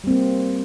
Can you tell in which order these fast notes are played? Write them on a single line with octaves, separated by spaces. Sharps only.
G3 C4 A#3